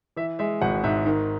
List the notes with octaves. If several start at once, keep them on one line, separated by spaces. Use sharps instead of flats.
E3 E5
G#3 E5
G#1 F#5
G#2 E5
D#3